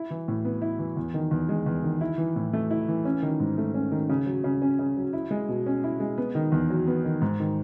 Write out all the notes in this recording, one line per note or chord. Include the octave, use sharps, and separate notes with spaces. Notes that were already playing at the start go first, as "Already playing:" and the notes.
Already playing: E4
E3
A2
B3
E4
E3
E2
D#3
E2
G#3
E2
D#3
E4
E3
A2
A3
E4
E3
C#4
D#3
G#2
A3
C#4
D#3
C#3
F#3
C#3
C#4
C#3
F#3
E4
G#3
B2
C#4
E4
G#3
B3
D#3
E2
F#3
B3
D#3
G#2
D#3